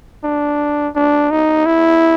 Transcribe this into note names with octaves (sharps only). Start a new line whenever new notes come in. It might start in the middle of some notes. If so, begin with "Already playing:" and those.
D4
D4
D#4
E4